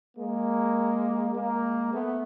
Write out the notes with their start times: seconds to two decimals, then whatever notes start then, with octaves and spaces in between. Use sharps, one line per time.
0.17 G#3 A#3
1.35 G#3 A#3
1.94 A3 B3